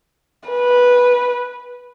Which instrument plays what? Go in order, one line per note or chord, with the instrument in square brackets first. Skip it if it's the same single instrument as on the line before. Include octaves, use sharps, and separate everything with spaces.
[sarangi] B4